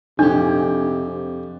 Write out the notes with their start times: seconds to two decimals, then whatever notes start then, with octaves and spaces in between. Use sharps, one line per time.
0.19 F2 C3 D4 G4